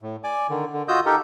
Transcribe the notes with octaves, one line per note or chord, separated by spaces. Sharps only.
A2
D5 G#5 D6
D3 D#3
D3
F4 F#4 D#5 D#6 E6 G6
D#4 G4 A4 A#4